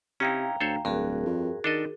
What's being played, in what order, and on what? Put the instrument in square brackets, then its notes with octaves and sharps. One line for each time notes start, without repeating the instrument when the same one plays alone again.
[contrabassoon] C3 [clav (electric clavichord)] C#4 D#4 E4 [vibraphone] F5 G5 A#5
[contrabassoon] D2 [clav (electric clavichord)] A4 C5 C#5
[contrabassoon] D1 [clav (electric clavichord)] G2 [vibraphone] F#4 G#4 A#4
[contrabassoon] F2
[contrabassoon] D#3 [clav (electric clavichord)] D4 A4 D#5